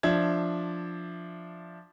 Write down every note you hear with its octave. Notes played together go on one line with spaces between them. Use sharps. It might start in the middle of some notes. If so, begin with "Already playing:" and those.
F3 D4 E5 G#6